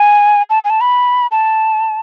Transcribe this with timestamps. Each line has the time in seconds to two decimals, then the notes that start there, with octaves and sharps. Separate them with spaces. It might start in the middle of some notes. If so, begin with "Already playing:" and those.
Already playing: G#5
0.50 A5
0.64 G#5
0.70 A5
0.81 B5
1.31 A5